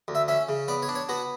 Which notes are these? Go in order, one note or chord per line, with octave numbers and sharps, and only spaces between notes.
D2
E5
C#4 E5
C#3
B3 D5
C#5
D4
C#5
B3 F#4